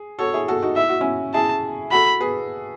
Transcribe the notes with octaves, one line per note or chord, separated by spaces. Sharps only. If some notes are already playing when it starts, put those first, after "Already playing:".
Already playing: G#4
F#4 A4 C#5
E4 G#4
F#4 A4
D#4 F#4
E4 E5
F#4
C#4 E4
E4 G#4 A5
F#4 A4 B5
G#4 B4